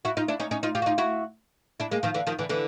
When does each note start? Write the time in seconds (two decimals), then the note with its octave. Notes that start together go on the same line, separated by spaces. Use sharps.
0.05 E4 F#4
0.17 D#4 F4
0.28 D4 E4
0.40 C#4 D#4
0.51 C#4 D#4
0.63 D#4 F4
0.75 F4 G4
0.82 F#4
0.86 D#4 F4
0.98 E4 F#4
1.80 D4 E4
1.91 G#3 A#3
2.03 D#3 F3
2.14 D3 E3
2.27 D#3 F3
2.39 D3 E3
2.49 D3 E3